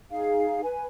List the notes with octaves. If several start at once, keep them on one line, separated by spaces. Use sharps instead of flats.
D#4 G#4 F5
B4 G#5